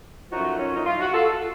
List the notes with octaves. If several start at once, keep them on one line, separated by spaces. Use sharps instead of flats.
F#2 F3 A3 D#4 F#4
C#4
D#4
F4
F#4
F4 A4